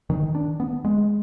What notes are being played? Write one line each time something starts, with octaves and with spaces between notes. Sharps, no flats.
D#3
D4
B3
G#3